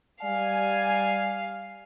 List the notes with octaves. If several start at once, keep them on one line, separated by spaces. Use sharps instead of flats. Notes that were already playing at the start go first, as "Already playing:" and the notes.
G3 D5 F5 G#5